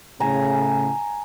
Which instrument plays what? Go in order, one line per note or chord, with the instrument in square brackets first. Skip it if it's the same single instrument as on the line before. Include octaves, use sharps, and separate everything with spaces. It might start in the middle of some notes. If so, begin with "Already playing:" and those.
[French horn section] A2 C#3 [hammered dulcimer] G#5 A#5